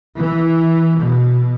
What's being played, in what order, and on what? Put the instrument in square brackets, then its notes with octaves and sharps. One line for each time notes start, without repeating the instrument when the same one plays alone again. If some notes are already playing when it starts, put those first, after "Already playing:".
[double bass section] E3
B2